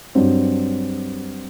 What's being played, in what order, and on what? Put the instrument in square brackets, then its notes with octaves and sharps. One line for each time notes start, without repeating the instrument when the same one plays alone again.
[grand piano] G2 F#3 C4